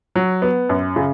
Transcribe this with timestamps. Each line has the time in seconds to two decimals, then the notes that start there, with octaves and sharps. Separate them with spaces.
0.16 F#3
0.42 B3
0.69 F#2
0.96 C#3